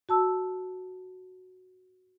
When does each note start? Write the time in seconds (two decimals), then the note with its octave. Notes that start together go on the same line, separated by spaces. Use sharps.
0.09 F#4 A5 E6